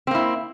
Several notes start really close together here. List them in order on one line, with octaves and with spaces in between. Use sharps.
C4 A#3 E4